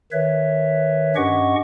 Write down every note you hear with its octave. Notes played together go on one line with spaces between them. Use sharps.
D#3 B4 C#5 E5
G2 C#4 G4 D#5 F#5 C#6